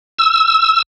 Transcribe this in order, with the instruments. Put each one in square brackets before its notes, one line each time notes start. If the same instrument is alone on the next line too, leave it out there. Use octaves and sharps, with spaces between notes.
[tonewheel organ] E6